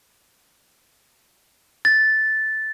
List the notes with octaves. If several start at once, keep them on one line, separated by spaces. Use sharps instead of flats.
A6